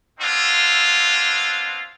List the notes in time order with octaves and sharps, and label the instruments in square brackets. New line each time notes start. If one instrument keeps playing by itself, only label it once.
[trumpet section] B3 C4 D4 E4 F4